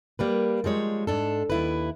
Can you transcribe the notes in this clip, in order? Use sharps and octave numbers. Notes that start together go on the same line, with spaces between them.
G3 A#3 B4
F3 G3 G#3 C#5
G#2 D4 A4
D#2 E4 B4